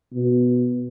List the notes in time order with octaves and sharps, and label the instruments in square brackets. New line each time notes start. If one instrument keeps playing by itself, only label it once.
[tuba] B2